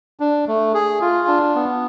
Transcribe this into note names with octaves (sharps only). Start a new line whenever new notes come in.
D4
A3
G#4
F4
D4
B3